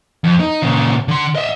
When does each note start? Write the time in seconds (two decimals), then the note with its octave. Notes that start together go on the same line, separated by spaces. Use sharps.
0.24 F2
0.40 D#4
0.62 A#2 C#3
1.08 D3 C6
1.35 D#5 E5